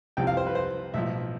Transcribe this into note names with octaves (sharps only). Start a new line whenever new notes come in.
C2 C3 F3 G5
F5
C5
B4
C5
B1 A2 F3 E5